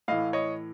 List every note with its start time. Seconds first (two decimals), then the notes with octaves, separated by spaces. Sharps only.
0.08 A2 E3 D#5 F5
0.33 C#5 D#5